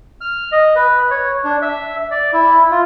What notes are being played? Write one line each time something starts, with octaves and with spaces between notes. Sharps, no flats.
F6
D#5
B4
C#5
D4
E5
D5
E4
F4